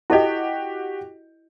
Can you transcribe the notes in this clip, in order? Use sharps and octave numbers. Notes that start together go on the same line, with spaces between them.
E4 F#4 G4 A4 D#5